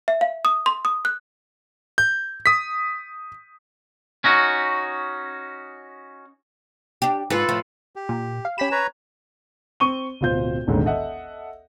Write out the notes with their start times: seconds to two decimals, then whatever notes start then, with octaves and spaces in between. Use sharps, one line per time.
0.08 E5
0.21 F5
0.45 D#6
0.66 C6
0.85 D#6
1.05 F#6
1.98 G6
2.46 D#6 B6
4.24 C#4 D#4 F#4
7.02 D4 G4
7.30 G#2 F4 A4 B4
7.49 A2 F3
7.96 G4
8.09 A#2
8.45 F5
8.58 C#4 G4 B5 B6 E7
8.71 B4 C#5 A#5
9.80 C4 C#6 D#7 G7
10.21 D1 B2 F4 C5 G6
10.67 E1 A1 D#2 G#2 D3 D#3
10.86 A4 D#5 E5 F#5